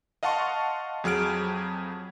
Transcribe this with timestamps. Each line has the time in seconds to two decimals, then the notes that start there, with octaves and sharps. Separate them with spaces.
0.23 D#5 F5 F#5 A5 C6 C#6
1.04 F2 F#3 G#4 F6 D7